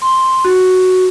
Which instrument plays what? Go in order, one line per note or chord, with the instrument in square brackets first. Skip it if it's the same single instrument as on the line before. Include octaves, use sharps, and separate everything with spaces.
[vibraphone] C6
F#4